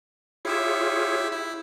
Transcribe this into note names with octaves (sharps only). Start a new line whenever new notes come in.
E4 F4 G4 G#4 C#5 E5
E4